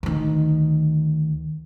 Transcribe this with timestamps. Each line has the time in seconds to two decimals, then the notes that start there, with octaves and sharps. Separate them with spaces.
0.03 D2 D#3